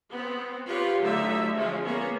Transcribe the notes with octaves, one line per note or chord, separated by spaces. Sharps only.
B3 C4
F4 G4 B4 C#5
D3 F#3 A3 D#4 E5
F3 G#3 C#4 F4
A#3 B3 C#4 C#5